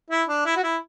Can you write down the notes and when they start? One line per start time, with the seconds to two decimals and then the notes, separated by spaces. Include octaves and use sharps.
0.10 E4
0.28 D4
0.46 E4
0.56 F#4
0.64 E4